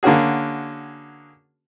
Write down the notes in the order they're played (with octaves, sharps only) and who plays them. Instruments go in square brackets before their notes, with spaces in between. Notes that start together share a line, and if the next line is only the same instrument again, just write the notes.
[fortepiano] D3 A#3 C#4 F#4 G#4